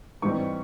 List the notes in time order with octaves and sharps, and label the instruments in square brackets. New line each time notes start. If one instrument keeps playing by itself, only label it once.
[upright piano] G#2 E3 G3 C4 D#4 C#6